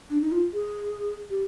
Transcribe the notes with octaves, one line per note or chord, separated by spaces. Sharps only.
D4
D#4
F4
G#4
G4